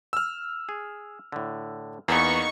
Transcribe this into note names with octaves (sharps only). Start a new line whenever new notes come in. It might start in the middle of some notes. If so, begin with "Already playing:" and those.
E6 F6
G#4
A2 D3
E2 A#3 B3 D#4 C#6